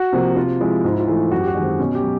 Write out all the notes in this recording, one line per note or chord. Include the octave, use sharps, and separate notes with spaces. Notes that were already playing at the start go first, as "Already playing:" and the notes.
Already playing: F#4
C3 F3 A#3
C3 F4
F3 G#3 E4
G#2 F4
E4
F4
E3 A3
F#2 F#4
G4
F#4
D#3 G#3
C4
B2 C#4
G4
F#3